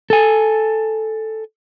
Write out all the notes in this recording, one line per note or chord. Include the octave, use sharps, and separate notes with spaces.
A4 G#5